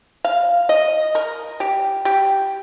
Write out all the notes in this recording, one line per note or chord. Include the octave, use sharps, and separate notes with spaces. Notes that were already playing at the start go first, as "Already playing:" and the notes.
F5
D#5
A#4
G4
G4